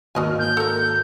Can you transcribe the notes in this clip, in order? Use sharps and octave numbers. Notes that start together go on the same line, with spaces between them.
G#1 D#2 F#3 D#5 G#5 F6
G6
A4 A#4